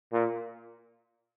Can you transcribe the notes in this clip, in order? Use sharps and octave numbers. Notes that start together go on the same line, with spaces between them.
A#2